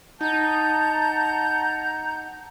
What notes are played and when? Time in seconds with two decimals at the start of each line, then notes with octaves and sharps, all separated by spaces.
0.21 D#4 F#5 A5 A#5 G6